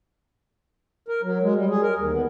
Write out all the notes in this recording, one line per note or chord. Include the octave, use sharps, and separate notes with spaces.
A#4
F#3
G#3
G3
G#4
A#4
D#2
B3